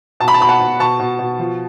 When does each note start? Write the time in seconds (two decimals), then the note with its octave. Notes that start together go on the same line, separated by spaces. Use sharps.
0.20 B2 A5
0.28 B5
0.34 A5
0.40 B2 B5
0.49 F#5 A5
0.60 B2
0.80 B2 A5 C#6
0.99 B2
1.19 B2
1.39 F3